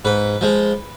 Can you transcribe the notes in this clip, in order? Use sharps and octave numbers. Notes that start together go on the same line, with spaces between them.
G#2 B4
F3 G#3